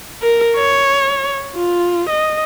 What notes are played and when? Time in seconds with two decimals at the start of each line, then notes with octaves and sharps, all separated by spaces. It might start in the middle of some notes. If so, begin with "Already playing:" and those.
0.22 A#4
0.56 C#5
1.56 F4
2.09 D#5